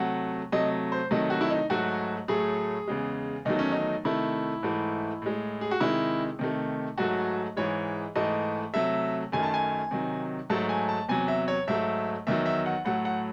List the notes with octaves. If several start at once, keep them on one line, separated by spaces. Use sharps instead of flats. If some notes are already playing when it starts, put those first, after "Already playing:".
Already playing: C3 F#3 A3 F#5
C3 F#3 A3 D#5
C5
C3 D#3 F#3 A3 D#5
F#4
E4
D#4
G#2 F#3 A3 F#4
A2 F#3 A3 G#4
E2 C#3 G#3
E2 D#3 F#3 A3 D#4
C#4
D#4
C3 D#3 A3 E4
G#2 E3 A3
A2 G#3
G#4
F#4
C3 D#3 G#3 E4
C3 D#3 A3
G#2 F#3 A3 F#4
G#2 E3 G#3 C#5
G#2 E3 A3 D#5
C3 F#3 A3 E5
F#2 D#3 A3 G#5
A5
G#5
C3 D#3 F#3
G#2 F#3 A3 A5
G#5
A5
E2 C3 F#3 G#5
E5
C#5
G#2 F#3 A3 E5
E2 D#3 F#3 E5
E5
F#5
A2 F#3 A3 F#5
F#5